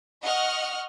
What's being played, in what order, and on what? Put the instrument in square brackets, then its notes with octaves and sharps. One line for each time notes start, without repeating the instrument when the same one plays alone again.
[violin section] D#5 F#5 C#6 F6